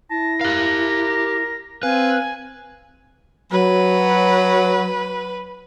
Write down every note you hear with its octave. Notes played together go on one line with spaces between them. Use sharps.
E4 A5 A#6
G4 A#4 F5
C4 B4 F5 G#5
F#3 B4